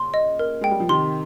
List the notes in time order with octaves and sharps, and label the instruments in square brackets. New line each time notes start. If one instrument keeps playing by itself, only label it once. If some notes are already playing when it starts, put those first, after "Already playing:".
Already playing: [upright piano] A#2 C#3 [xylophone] C6
[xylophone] D#5
A#4
[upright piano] G#3 [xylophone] G5
[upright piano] G3
F3
[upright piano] C3 D#3 [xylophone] C6